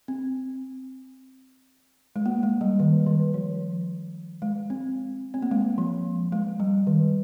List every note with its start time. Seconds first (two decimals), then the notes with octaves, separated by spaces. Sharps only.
0.08 C4
2.16 G#3
2.26 A#3
2.43 G#3
2.61 G3
2.80 D#3
3.07 D#3
3.34 F3
4.42 G#3
4.70 C4
5.34 C4
5.42 A#3
5.51 G#3
5.78 F3
6.32 G#3
6.60 G3
6.87 D#3